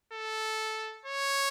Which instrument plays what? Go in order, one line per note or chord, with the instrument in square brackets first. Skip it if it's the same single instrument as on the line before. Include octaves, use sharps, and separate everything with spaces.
[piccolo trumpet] A4
C#5